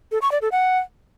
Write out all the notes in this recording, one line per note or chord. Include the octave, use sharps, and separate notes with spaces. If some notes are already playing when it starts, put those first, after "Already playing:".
A4
C#6
D5
A4
F#5